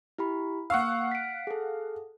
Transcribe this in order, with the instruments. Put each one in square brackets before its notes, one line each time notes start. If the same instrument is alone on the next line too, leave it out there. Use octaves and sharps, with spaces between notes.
[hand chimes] E4 G4 B5
[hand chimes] A#3 C#6 E6 [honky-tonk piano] F5 F#5
[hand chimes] B6 D7
G#4 A4